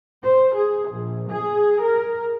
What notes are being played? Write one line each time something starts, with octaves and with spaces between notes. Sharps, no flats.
C5
G#4
A#1
G#4
A#4